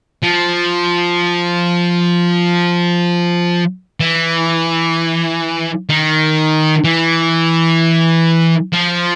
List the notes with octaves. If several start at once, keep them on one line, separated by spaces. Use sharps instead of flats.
F3
E3
D#3
E3
F3